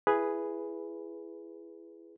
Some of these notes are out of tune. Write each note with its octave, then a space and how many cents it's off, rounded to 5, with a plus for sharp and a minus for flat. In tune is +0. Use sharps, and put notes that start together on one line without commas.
E4 +20 G#4 +0 B4 +0